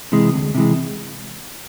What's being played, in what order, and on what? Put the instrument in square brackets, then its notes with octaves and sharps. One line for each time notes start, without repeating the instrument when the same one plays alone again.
[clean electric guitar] C3 E3 G#3
D2
C3 E3 G#3